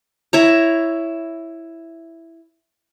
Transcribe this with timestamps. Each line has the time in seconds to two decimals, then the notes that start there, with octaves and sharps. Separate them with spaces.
0.33 E4 C#5 A#5